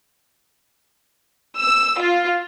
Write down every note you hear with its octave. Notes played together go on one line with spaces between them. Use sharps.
E6
F4